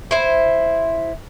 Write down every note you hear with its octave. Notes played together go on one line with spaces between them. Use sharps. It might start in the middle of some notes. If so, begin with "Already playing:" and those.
E4 C5